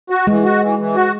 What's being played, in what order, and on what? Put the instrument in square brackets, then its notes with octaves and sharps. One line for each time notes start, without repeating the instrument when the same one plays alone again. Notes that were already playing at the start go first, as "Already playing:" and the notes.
[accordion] F#4
[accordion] E3 [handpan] G#3
[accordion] F#4
E3
E3
F#4